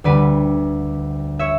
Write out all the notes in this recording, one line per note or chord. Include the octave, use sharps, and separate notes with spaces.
D2 D3 G3 B4 D5
C#5 E5